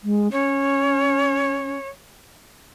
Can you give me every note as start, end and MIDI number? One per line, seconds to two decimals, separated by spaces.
0.03 0.31 56
0.32 1.78 61
0.32 1.88 73